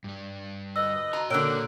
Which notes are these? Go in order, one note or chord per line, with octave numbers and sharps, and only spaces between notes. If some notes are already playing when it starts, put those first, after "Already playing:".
G2 G3
D2 B4 D#5 E6
F#4 A#5 C6
A#2 D3 A#3 F#4 C#5 G5 E6 F#6